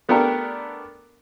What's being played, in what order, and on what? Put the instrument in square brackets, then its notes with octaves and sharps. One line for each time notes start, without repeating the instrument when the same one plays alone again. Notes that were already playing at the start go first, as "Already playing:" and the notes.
[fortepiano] A3 B3 D4 G4 A4 A#4